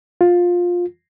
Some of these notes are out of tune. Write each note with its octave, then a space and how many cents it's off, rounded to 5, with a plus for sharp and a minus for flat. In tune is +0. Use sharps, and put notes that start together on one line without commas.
F4 +15